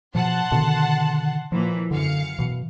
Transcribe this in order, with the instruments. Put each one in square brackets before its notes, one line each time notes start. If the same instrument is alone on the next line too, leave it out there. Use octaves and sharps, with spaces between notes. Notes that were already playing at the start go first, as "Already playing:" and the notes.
[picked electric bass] B2 F3 [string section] F#5 A5 C6
[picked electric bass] B2 D3 D#3
[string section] A#2 E3 [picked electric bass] F3
[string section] F#2 F5 C#7 [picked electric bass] D3
[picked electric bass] B2 E3